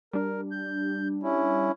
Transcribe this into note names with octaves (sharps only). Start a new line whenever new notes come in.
G3 D4 A#4
G6
C#4 E4